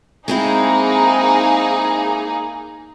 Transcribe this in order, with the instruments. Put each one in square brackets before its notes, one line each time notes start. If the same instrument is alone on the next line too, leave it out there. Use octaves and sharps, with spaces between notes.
[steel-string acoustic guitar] G#3 C4 E4 [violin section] A#3 D#4 G#4